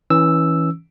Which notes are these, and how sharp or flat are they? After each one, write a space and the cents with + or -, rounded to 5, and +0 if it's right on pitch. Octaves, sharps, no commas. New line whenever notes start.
E3 -15 C#4 +0 E6 +0